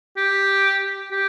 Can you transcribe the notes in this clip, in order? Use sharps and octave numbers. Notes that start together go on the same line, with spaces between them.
G4
G4